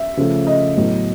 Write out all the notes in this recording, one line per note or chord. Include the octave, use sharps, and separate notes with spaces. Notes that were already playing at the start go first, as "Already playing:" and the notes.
Already playing: E5
C#3 F3 A3
D#5
A2 F#3 B3